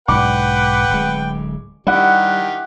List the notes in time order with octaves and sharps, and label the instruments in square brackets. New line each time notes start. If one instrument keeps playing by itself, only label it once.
[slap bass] B1 G#2 [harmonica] B4 F#5 G5 [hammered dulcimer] D6
[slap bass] D1 G#3
[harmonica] D#3 G4 [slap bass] G3 [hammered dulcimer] E4 F#5